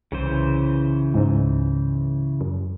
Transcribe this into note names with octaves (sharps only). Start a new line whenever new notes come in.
C2 C#3 E3 C5
C#2 G#2
F#2